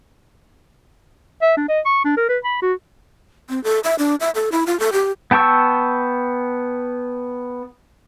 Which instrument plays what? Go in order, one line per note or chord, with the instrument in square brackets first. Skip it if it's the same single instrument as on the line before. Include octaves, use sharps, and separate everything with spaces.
[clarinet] E5
D4
D#5
C#6
D4
A#4
B4
B5
F#4
[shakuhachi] C4
A4
E5
D4
E5
A4
E4
F4
A4
G4
[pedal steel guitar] B3 G5 A5 C#6 E6